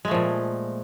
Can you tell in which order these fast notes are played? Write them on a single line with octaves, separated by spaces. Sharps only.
G#3 A3 F3 A#2